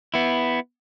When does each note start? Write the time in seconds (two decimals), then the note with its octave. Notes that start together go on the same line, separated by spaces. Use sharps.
0.14 B3 E4